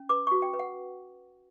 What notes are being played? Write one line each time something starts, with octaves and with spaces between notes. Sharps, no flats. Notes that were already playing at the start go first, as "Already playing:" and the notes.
Already playing: C#4
B4 D6
C#6
F#4
G5
B4
F#5